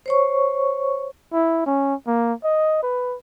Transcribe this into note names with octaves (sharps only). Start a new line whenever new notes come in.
C5 C#5 C#6
E4
C#4
A#3
D#5
B4